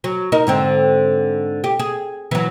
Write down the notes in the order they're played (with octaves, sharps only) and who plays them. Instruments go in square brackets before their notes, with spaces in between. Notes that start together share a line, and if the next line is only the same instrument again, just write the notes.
[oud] F#3
D#4 A#4
G#2 D3 C4
G4
G#4
E3 F#3